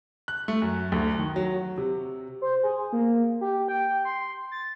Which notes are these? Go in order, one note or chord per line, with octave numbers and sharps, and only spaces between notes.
F#6
A3
F#2
D2
D#3
F#3
F#4
C3
C5
G#4
A#3
G4
G5
C6
A6